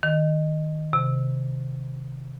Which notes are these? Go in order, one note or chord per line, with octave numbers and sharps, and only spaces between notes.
D#3
C3